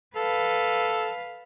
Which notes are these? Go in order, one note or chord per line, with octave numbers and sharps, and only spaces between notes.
A4 B4 F5